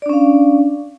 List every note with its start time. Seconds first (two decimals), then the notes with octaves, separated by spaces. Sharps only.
0.02 D5
0.06 D4
0.09 C#4
0.13 F5